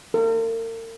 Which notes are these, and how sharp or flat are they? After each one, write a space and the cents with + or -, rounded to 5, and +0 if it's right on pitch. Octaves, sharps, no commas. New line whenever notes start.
A#4 -45